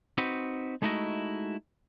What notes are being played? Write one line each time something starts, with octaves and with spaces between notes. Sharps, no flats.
C4 D#4 F#4 B4
G#3 A3 D#4 E4 F#4 D#5